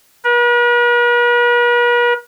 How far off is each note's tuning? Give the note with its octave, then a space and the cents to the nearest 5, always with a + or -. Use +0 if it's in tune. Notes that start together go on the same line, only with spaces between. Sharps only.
B4 -45